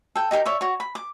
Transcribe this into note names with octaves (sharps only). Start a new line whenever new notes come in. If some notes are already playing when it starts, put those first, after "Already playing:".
A4 G5
D#4 G4 A4 A#4
C#5 D5 E5
F#4 C#5
B5
D6